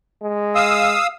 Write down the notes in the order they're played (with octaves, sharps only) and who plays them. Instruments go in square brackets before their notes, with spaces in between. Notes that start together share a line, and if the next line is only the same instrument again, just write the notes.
[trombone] G#3
[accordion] F5 D#6 E6